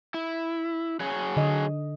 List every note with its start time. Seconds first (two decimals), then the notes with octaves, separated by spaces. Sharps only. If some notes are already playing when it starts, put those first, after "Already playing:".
0.14 E4
1.00 F#3 G#4 C#5
1.37 D3 D#5